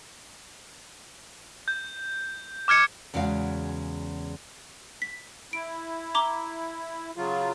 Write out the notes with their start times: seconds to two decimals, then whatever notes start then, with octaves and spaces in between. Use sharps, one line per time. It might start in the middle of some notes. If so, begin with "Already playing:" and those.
1.68 G6
2.68 D6 F6 G#6 C#7
3.14 E2 C#3 G#3 F#4 F5
5.02 B6
5.53 E4 D7
6.15 A#5 D6 G7
7.17 C#3 F#3 F4